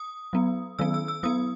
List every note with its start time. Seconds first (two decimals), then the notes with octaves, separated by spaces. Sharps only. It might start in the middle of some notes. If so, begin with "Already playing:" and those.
Already playing: D#6
0.33 F#3 B3
0.79 D#3 F#3 B3 E6
0.94 E6
1.08 E6
1.23 F#3 B3 D#6